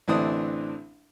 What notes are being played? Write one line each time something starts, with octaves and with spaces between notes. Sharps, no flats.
A1 D3 E3 C4 D4 D#6